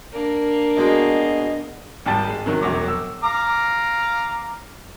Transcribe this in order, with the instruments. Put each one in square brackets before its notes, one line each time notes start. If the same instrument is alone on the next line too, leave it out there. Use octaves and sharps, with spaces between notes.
[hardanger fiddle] A#3 D4
[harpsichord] B2 G#3 [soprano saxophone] D#5
[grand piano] G#1 G3 G5 A5 A6
G#3
C3 D#3 F#3
E1 A#1 F#3 D6
E6
[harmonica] F5 A#5 D6